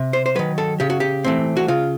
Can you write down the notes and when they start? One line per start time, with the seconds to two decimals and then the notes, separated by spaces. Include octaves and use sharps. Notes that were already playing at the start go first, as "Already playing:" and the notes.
Already playing: C3
0.13 C5
0.26 C5
0.35 D#3 F#3 B4
0.58 A4
0.80 C#3 G4
0.90 F#4
1.00 G4
1.24 E3 A3 C4
1.57 F#4
1.68 C#3 F4